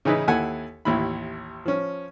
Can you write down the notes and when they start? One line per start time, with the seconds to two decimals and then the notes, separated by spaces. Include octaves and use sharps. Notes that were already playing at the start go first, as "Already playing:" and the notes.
0.05 C#3 E3 D#4 E4 B4
0.27 D#2 E4 A4 F#5 G#5
0.85 A1 D#2 E4 B5
1.66 F3 C#4